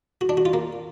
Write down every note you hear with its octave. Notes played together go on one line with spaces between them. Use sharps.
F#4
D4
F#4
F4
A#3